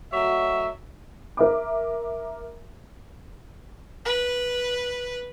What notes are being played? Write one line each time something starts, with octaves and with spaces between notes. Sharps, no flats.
F#3 A3 F#4 C#5 D#5 E5
A#4 E5 D6
B4